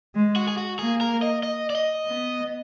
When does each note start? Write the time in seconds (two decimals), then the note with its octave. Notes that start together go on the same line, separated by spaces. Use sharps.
0.15 G#3
0.36 F#4
0.48 G#4
0.57 F#4
0.79 A#3 G#4
1.01 A#4
1.22 D#5
1.43 D#5
1.70 D5
1.75 D#5
2.07 B3